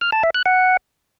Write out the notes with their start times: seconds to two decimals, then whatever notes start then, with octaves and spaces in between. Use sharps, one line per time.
0.01 F6
0.12 A5
0.23 E5
0.35 F#6
0.46 F#5